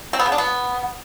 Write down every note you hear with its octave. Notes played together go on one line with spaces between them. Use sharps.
C4
B3
C#3
D4
B3